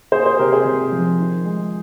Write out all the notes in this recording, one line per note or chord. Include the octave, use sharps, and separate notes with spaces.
A#3 G#4 C5
G#4 C5
C3 G4 A#4
G#4 C5
C3
F3
D#3
G#3